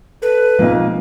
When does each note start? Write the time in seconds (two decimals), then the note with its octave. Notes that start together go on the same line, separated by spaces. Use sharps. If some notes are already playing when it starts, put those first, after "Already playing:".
0.22 A4 B4
0.59 B1 F3 G#3 A#3 C4 F4